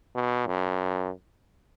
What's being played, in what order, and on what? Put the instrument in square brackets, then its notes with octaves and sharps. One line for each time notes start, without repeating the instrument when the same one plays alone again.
[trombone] B2
F#2